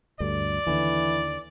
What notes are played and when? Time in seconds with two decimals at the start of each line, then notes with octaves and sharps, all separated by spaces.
0.20 D2 G2 D3 D5
0.67 D#2 D3 E3